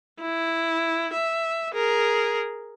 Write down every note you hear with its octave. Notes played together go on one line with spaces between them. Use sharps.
E4
E5
G#4 A#4